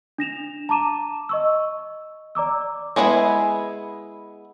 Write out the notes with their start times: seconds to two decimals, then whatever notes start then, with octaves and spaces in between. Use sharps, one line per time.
0.18 D4 A#6 E7 F7
0.69 A5 A#5 D6 D#7 E7
1.29 D#5 C#6 E6
2.35 D5 A#5 D6 E6
2.96 G#3 B3 D4 E4 G#4